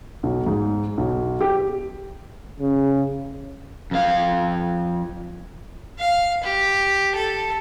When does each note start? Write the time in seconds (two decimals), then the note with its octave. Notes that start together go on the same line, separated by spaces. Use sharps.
0.23 B1
0.46 G#2
0.97 B1
1.41 G4
2.60 C#3
3.91 F2 F5
5.99 F5
6.43 G4
7.15 A4